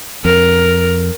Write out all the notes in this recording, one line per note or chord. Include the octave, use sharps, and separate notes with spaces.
F2 A#4